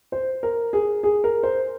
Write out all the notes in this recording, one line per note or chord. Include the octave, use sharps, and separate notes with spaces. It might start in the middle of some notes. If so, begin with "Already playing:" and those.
C5
A#4
G#4
G#4
A#4
C5